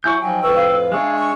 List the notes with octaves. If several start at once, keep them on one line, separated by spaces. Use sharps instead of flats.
F#3 E4 G#5 C#6 G6
F3 F#3 D#4 G5 G#5
F2 A2 B4 C#6 E6
F5
G#3 D4 C#5 E5 G#5
C#6